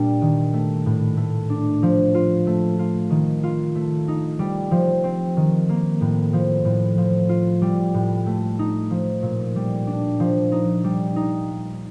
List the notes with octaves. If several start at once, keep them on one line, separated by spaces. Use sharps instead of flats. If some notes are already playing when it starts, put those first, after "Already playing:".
Already playing: A#2 G3 D4
D#3
A3
A2
A3
D4
F3
F4
A3
F4
D#3
F4
A3
D#4
G3
F3
C4
D#3
A#3
A2
F3
A2
F3
F4
G3
A2
A3
D#4
F3
A#2
G3
D4
F3
D#4
G3
D#4